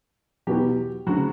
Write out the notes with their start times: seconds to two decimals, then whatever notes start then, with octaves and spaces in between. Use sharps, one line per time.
0.47 E2 B2 F#3 G4
1.07 D2 C#3 F#3 F#4